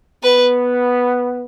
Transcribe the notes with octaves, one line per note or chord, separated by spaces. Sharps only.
B3 B4